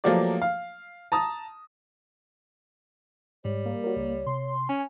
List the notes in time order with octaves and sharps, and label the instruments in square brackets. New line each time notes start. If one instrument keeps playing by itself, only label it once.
[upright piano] F3 F#3 A3 A#3 G4 D5
F5
A5 A#5 D#6
[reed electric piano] G#2 [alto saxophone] G3 [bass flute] C#5
[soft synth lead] A#3
[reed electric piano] F#4 A#4 [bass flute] C#5
[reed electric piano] C#2
[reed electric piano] C3 [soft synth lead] C6
[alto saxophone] C#4 [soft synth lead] G#5